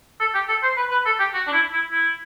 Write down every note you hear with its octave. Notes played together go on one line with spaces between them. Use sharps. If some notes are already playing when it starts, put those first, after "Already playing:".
A4
G4
A4
C5
B4
B4
A4
G4
F#4
D4
E4
E4
E4